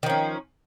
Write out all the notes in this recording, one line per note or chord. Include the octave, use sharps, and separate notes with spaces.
D#3 F3 C#4